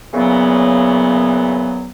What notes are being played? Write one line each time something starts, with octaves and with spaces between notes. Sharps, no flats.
A#2 C#3 E3 F#3 B3